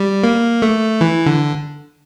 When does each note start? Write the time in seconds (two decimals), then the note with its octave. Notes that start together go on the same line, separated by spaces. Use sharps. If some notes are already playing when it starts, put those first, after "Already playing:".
Already playing: G3
0.24 A#3
0.62 A3
1.01 E3
1.26 D3